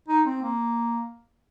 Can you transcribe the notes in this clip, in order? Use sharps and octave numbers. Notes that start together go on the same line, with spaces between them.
D#4
C4
A#3